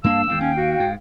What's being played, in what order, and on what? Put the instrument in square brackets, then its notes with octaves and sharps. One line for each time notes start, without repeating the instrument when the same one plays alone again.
[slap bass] G2 A#3 D4 [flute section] F5 A5 [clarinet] E6
[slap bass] G#1 E2 G#2 [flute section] F5 G5
[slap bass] D#2 [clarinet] C#4
[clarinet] F#4
[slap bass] G#2